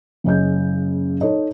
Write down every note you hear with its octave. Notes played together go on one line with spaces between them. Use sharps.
F#1 C#3 C#4 D#5 G6
D#4 A4 C#5 D#5